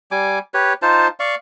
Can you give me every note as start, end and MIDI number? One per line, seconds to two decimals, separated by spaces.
0.11 0.39 55
0.11 0.39 80
0.11 0.39 86
0.54 0.73 67
0.54 0.73 71
0.54 0.73 73
0.82 1.08 63
0.82 1.08 65
0.82 1.08 72
0.82 1.08 81
1.20 1.35 74
1.20 1.35 77
1.20 1.35 85